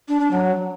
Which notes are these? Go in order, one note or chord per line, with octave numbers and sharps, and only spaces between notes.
D4
D4
F#3